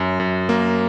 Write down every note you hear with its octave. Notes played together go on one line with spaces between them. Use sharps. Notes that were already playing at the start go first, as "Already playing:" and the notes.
Already playing: F#2
F#2
A#3